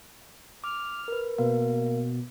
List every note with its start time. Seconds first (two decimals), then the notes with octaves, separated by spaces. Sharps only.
0.64 D6 F6
1.08 A#4 B4
1.38 B2 A#3 A#4 F5